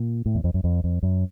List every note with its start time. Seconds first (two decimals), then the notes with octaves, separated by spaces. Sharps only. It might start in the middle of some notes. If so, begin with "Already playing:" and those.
Already playing: A#2
0.26 A2
0.35 E2
0.44 F2
0.54 F#2
0.64 F2
0.84 F2
1.03 F#2